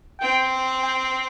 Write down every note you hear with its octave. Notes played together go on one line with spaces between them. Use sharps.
C4 G5
G5